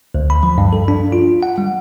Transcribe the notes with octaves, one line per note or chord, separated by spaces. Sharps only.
D2
B5
F3
G2
A4
D4
F4
F#5
G3